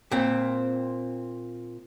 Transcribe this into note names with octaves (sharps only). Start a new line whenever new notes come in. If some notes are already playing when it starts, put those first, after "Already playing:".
A#2 C4